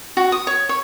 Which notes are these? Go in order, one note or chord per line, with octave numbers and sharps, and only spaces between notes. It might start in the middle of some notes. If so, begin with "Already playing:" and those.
F#4
D#6
C#5
C#5